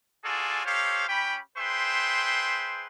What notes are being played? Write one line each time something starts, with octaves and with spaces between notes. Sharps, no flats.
F4 F#4 G#4 A4 D5 G#5
G4 A4 C5 C#5 F5
C#4 G4 G5 B5
G#4 B4 C5 E5 G5 C6